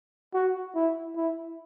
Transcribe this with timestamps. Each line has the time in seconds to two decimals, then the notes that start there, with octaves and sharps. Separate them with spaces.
0.34 F#4
0.75 E4
1.16 E4